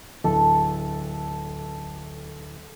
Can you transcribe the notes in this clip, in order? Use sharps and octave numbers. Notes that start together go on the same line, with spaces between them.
D1 A4